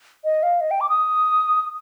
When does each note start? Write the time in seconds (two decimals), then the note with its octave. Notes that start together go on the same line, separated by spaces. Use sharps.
0.24 D#5
0.43 F5
0.61 D#5
0.71 G5
0.81 D6
0.89 D#6